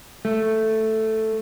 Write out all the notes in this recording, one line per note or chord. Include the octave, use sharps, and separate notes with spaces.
A3